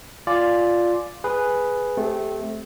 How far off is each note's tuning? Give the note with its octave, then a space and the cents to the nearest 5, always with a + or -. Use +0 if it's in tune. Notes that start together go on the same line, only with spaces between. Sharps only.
F4 +0 D5 +0 G#5 +15
G#4 +0 B4 +0
A3 -20 C4 -15 G4 +0